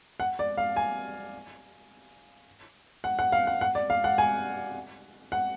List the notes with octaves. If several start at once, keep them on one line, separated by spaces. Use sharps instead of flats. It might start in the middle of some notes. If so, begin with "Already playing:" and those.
F#5
D5
F5
G#5
F#5
F#5
F5
F#5
F#5
D5
F5
F#5
G#5
F#5